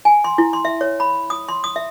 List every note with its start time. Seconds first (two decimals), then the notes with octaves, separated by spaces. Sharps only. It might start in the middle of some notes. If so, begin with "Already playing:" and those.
0.05 G#5
0.24 C6
0.38 E4
0.53 C6
0.65 E5
0.81 C#5
1.00 B5
1.30 D#6
1.49 C6
1.64 D#6
1.76 E5